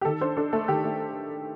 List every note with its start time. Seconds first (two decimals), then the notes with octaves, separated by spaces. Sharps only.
0.01 G4
0.05 D#3 A4
0.21 D4 C5
0.37 D4 A4
0.53 A3 A4
0.68 D#3 G4
0.84 A3